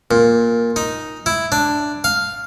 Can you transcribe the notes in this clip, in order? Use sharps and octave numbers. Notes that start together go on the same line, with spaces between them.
A#2
D#4
E4
D4
F5